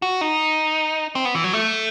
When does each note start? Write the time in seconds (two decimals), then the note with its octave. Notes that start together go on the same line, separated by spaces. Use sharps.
0.02 F#4
0.21 D#4
1.15 C4
1.25 B3
1.35 E3
1.44 F#3
1.53 A3